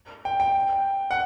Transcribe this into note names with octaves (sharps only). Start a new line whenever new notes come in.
G5
G5
F#5